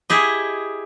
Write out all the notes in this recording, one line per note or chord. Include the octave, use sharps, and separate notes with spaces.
E4 G4 G#4 D#5